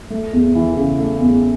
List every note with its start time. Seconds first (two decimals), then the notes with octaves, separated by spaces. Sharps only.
0.10 A3
0.33 E2
0.55 E3
0.77 C#3
0.99 A3
1.21 E2